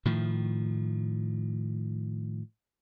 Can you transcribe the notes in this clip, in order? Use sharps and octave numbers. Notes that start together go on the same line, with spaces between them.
A2 D#3 F3